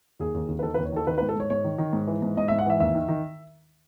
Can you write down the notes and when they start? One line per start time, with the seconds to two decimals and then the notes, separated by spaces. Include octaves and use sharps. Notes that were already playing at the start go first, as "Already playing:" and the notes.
0.19 D#2 G#4
0.34 D#2
0.48 D#2
0.59 B4
0.63 D#3 A4
0.74 B4
0.78 D#2
0.85 C#5
0.92 D#3 A4
1.07 D#3 B4
1.18 B4
1.22 G#2
1.29 A4
1.36 G#2 C#5
1.50 G#2 C#5
1.64 D#3
1.78 D#3
1.93 G#2
2.07 E3
2.22 G#2
2.37 G#2 D#5
2.48 E5
2.52 G#2
2.59 F#5
2.66 E3 E5
2.80 D#2 E5
2.95 D#3
3.08 D#3